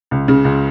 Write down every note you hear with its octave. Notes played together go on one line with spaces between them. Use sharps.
C#2
C#3
C#2